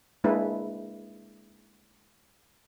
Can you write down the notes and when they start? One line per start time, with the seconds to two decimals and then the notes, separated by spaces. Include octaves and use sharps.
0.24 G#3 A#3 D4 E4 B4